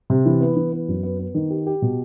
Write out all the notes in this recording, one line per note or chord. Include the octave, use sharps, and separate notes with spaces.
C3
E3
B3
E3
B3
F#2
B3
B3
D#3
G4
G4
B2